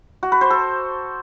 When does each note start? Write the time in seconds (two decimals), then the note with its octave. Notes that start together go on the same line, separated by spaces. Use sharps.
0.23 F#4
0.32 B4
0.41 C5
0.50 A4